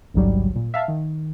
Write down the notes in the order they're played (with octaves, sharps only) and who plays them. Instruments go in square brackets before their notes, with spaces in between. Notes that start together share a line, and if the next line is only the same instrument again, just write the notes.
[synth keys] A1 D2 G#2 F#3 G3
A#2
E5 F5 A5
D#3